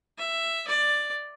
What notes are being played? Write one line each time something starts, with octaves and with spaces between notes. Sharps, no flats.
E5
D5